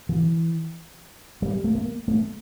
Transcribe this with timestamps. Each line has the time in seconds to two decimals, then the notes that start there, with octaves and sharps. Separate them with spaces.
0.09 E3
1.42 G3
1.64 A3
1.75 A#3
2.08 A3